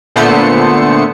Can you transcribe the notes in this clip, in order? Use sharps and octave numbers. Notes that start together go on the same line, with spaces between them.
A#2 D3 A3 B3 C5 C#7